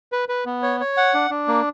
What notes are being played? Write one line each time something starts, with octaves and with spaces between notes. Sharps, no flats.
B4
B4
B3
C#5
C#5
F#5
D4
D4
A#3